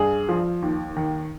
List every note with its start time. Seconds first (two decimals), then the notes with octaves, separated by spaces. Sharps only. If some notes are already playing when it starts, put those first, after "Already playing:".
Already playing: G2 G#4
0.29 F3
0.62 D#2
0.96 D#3